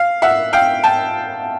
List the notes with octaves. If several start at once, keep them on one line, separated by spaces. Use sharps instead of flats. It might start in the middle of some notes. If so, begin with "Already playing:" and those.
Already playing: F5
E5 F#5
F5 G5
G5 A5